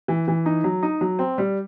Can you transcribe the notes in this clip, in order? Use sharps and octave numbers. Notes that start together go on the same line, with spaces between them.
E3
E3
D#4
F#3
D#4
F#3
C4
G3